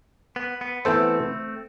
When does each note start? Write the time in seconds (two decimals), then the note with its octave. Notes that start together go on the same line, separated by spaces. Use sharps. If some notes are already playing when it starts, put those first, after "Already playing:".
0.36 B3
0.61 B3
0.85 E3 A3 B3 C4 E4 A4 C5